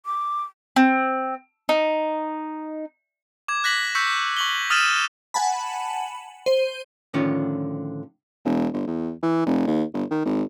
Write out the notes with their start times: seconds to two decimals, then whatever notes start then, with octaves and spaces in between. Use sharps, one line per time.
0.06 D6
0.76 C4
1.69 D#4
3.48 D6 G#6
3.64 F#6 A#6 B6 F#7
3.95 C#6 E6 G6 B6 C#7
4.37 C#6 F#7 G7
4.70 D#6 F6 A6 D#7 E7 F#7
5.34 F#5 G#5 A5 B5
6.46 C5 D#7 G7
7.14 A2 D3 D#3 F3 C#4 F4
8.45 E1
8.73 G1
8.87 E2
9.23 E3
9.46 F1
9.67 D#2
9.94 G1
10.11 D#3
10.25 G#1